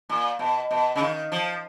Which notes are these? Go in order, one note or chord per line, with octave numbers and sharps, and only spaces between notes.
A#2
B2
B2
C#3
D#3
F3